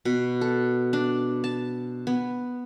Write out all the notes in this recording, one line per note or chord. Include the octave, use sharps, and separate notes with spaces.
B2
A4
D4
A5
B3